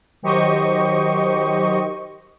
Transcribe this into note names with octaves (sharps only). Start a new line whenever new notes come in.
D#3 F#3 G4 C5 D#5 C#6